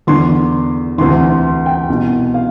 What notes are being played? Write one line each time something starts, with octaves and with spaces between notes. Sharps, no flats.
E2 D3 C6
D2 C3 E3 C6
G5
C2 B2
F5